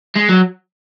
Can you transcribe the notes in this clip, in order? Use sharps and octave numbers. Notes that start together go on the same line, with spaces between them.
G#3
F#3